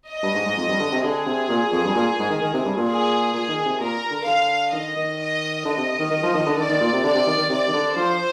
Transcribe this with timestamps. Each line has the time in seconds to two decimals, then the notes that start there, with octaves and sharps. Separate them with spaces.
0.11 D#5
0.22 G2
0.34 G#2
0.46 G#2
0.57 F2
0.69 G2
0.80 D3
0.92 C3
1.03 D3 G#4
1.27 C3
1.49 A#2
1.72 F2
1.84 G2
1.95 A#2
2.19 G#2
2.30 D#3
2.41 D#3
2.54 C3
2.65 G2
2.77 A#2
2.88 G#4
3.34 A#2 G#4
3.49 D#3
3.65 C3
3.80 A#2 A#4
4.11 D3
4.26 D3 F5
4.73 D#3 D#5
4.96 D#3
5.19 D#5
5.65 D3 D#5
5.77 C3
5.99 D#3
6.11 D#3
6.23 F3
6.35 D#3
6.46 D3
6.57 D#3 D5
6.69 D#3
6.81 A#2
6.93 C3
7.03 D3 D5
7.15 C3
7.27 D#3
7.38 D#3
7.49 C3 D5
7.68 D#3
7.74 D3
7.96 F3 C5